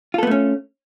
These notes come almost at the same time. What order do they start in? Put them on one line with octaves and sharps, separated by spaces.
F4 A4 B3 A3 C#4